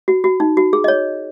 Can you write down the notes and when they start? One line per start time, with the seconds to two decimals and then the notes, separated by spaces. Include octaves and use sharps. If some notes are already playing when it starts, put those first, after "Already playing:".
0.08 F#4
0.24 F#4
0.40 D#4
0.57 F#4
0.73 G#4
0.84 D#5
0.88 C#5